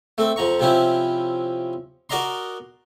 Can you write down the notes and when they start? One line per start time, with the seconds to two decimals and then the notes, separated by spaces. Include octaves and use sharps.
0.18 A3 C4
0.36 F2 F3 A#5 C#6
0.60 C3 F3 C4 C#4 E4
2.10 F#4 A#4 D5 D#5 A#5 C6